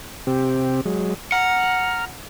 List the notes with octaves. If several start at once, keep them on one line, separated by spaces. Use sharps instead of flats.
C3 C4 G4
F#3 G#3
F#5 A#5 F6